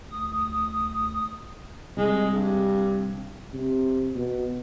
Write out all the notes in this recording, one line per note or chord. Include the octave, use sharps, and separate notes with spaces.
D2 D#6
C2 G#3
G2
C3
B2